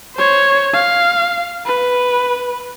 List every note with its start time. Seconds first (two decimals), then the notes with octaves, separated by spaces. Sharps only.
0.16 C5 C#5
0.74 F5
1.66 B4